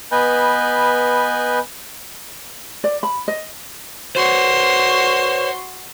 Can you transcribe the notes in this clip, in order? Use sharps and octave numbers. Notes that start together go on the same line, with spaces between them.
B3 B4 D#5 G#5 B5 G6
D5
B5
D#5
F#4 C5 C#5 C6